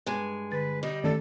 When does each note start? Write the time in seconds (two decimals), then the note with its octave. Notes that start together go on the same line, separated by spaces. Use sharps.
0.06 G2 G#3 G#5
0.52 D3 B4 A6
0.83 G3 D#5
1.04 D#3 A3 C#4 A4 D5